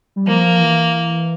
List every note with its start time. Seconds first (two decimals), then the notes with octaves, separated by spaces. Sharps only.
0.16 G3
0.27 F3 A#3
0.55 F3
0.60 E3